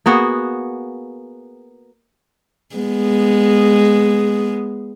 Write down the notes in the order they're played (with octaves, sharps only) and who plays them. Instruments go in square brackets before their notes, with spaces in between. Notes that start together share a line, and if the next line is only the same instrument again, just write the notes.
[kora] A#3 B3 F#4 G#4
[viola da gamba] G#3 B3